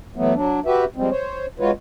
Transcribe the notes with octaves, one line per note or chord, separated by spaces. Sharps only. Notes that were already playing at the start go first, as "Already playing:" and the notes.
E3 F#3 A3 B3
F#3 D4
F#4 G4 B4 E5
F3 G3 G#3 C4
C5 C#5
G#3 F4 F#4 B4 C#5